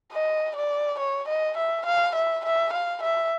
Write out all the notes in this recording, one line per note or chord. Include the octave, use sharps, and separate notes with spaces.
D#5
D5
C#5
D#5
E5
F5
E5
E5
F5
E5